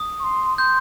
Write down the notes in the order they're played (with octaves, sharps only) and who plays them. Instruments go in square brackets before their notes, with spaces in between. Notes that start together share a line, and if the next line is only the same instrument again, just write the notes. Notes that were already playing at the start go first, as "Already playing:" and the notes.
Already playing: [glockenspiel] D#6
[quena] C#6
C6
[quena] C6 [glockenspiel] G6